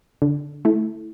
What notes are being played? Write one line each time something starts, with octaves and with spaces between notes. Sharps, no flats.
D3
A3 E4